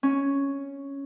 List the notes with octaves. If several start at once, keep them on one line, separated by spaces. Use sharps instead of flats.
C#4